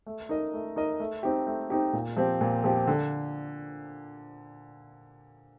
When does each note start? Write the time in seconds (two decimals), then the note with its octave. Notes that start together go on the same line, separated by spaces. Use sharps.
0.06 A3
0.29 D#4 A#4 D#5
0.53 A3
0.76 D#4 A#4 D#5
1.00 A3
1.23 C4 D#4 G4
1.47 A3
1.70 C4 D#4 G4
1.93 A#2
2.17 F3 C4 G4
2.41 A#2
2.64 F3 C4 G4
2.87 D3